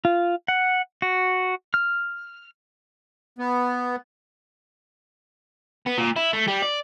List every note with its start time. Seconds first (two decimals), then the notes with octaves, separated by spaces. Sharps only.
0.05 F4
0.48 F#5
1.02 F#4
1.74 F6
3.39 B3
5.87 B3
5.98 A#2
6.16 E4
6.33 A3
6.48 G3
6.62 D5